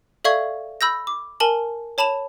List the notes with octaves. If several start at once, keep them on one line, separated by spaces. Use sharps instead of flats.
A4 D5 E5 F5 C#6 G#6
B5 E6 G6 A#6
D6
A#4 G#5 A5 F#7
C#5 A5 B5 E7 F7